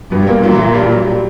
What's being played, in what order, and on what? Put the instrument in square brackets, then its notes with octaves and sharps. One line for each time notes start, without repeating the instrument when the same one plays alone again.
[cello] G2 [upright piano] B2 B3
[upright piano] G3
A#2 A#3
[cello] A#2 [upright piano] F#3
[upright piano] E3
F#3
G2 G3
G3
F#3
G3